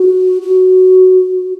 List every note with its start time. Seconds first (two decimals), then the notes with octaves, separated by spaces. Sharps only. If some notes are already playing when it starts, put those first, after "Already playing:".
Already playing: F#4
0.42 F#4